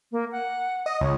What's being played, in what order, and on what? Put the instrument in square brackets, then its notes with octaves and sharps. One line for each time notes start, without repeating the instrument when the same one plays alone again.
[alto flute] A#3
F#5
[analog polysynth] D#5
[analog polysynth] C#2 [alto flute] C#5